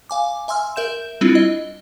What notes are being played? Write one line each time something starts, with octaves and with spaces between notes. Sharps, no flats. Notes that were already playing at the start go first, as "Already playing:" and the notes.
F5 G#5 D6
E5 G#5 C6 E6 F6
A#4 E5 G6 E7
G3 C4 D4 E4 F4
D#5